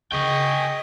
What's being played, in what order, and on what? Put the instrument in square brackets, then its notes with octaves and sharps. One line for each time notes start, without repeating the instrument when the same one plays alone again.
[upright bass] C#3 D4 [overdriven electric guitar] G#4 G5 [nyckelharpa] D#5 [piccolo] C#6